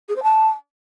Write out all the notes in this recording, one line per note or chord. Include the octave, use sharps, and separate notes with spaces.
G#4
C5
A5